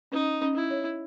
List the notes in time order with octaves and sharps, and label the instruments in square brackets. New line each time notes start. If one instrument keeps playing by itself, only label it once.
[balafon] C#4 [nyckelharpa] D#4
[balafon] C#4
[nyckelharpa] E4
[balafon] C#5